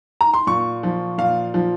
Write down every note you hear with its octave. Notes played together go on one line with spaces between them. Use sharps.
A#5
C6
A#2 C#6
F3
A#2 F5
F3